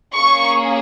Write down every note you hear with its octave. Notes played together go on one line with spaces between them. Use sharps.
A#3 C#4 G#4 C#6